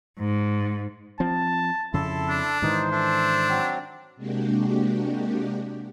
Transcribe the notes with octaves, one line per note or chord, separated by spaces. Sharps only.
G#2
F3 C4 A5
F2 C#3 E4 A4 A5 C6
D4
G#2 D#3 E3 D#4 C5
D4 A4 E5
F#3 C4
C3 G#3 A#3 D4 F#4 G4